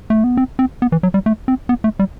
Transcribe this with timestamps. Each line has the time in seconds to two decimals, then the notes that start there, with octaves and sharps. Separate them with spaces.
0.10 A3
0.24 B3
0.37 C4
0.59 C4
0.82 B3
0.92 E3
1.03 F#3
1.14 G3
1.26 A3
1.48 C4
1.69 B3
1.84 A3
1.99 G3